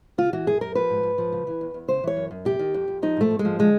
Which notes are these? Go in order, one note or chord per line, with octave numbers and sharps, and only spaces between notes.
C#3 F4
E3 F#4
F#2 G#4
F#2 A#4
F3 B4
G#2
G#2
F3
C#3
E3
E2
E2
C#3 C5
E3 C#5
F#2
F#2
C3 G4
D#3
F2
F2
F3 D#4
G#2 A3
G#2
G#3
F3
D3 G#3